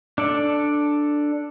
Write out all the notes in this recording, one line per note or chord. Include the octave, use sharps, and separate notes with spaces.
D4 A4 D5